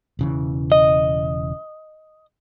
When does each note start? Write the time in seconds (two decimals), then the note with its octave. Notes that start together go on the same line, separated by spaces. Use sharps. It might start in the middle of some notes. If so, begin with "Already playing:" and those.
0.19 E1 C#3 E3
0.72 D#5